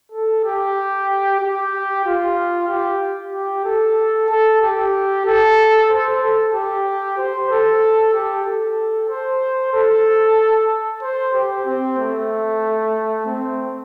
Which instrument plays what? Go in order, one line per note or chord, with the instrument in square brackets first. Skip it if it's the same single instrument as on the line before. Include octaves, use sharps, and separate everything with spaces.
[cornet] A4
G4
G4
F4
G4
G4
A4
A4
G4
A4
C5
A4
G4
C5
A4
G4
A4
C5
A4
C5
G4
C4
A3
C4